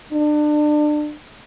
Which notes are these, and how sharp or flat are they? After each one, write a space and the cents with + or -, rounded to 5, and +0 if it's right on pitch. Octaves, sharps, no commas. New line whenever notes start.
D4 +30